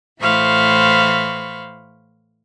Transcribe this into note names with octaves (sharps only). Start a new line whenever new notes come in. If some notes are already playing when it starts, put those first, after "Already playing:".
A2 E3 C5 F5 B5 C#6